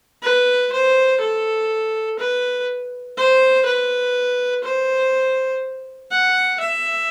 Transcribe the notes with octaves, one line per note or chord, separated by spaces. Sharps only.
B4
C5
A4
B4
C5
B4
C5
F#5
E5